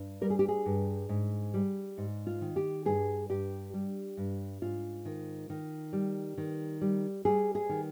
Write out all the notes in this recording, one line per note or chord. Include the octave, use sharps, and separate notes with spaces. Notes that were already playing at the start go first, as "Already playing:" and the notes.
Already playing: G2
G3 A#4
G#4
G4
G#4
G2
G#2
G3
G#2
F4
D#3
G4
G2 G#4
G2 G4
G3
G2
G#2 F4
D#3
D#3
G3
D#3
G3
G3 G#4
G#4
D#3